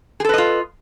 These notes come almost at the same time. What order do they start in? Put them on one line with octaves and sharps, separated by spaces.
G#4 A4 B4 D#5 F4